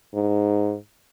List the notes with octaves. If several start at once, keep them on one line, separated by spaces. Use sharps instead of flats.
G#2